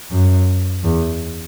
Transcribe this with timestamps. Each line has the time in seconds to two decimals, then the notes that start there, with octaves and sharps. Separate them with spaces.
0.11 F#2
0.84 E2